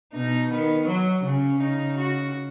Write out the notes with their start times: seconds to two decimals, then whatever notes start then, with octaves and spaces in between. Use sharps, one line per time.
0.13 B2 D#4
0.50 D#3 B3
0.87 F#3
1.24 C#3 C#4
1.60 C#3 D#4
1.97 F#4